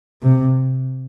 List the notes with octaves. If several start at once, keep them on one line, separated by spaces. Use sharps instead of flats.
C3